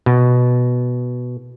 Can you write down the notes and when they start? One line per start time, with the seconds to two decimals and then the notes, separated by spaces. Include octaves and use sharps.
0.06 B2